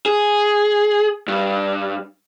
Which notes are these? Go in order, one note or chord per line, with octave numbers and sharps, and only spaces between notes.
G#4
G2